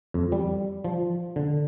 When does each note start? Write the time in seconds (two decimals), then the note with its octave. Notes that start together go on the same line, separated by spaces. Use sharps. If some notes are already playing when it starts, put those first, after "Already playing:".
0.14 F2
0.32 G3
0.84 F3
1.36 D3